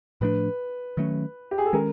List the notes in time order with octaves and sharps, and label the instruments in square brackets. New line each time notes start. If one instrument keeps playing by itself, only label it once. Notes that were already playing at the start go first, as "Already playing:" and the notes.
[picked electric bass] A2 F3 A3 D4 [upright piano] B4
[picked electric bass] D#3 F#3 A3 C#4
[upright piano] G4
G#4
A4
[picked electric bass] D#3 G#3 C#4 [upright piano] A#4